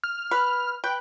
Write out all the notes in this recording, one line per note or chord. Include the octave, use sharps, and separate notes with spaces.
F6
B4
B4 G5